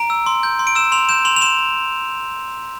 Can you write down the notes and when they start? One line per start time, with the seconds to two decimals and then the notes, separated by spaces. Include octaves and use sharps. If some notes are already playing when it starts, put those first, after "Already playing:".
Already playing: A#5 D7
0.10 E6
0.26 C6
0.43 G6
0.59 C6
0.67 D7
0.75 E6 E7
0.92 C6 F7
1.09 G6 E7
1.25 C6 F7
1.36 F7
1.41 C6 E7